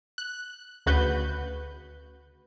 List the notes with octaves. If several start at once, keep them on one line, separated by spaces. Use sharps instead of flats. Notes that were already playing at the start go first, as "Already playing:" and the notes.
F#6
D2 C#3 F#4 B4 G6